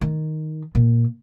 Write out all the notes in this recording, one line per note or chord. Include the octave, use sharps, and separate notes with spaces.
D#3
A#2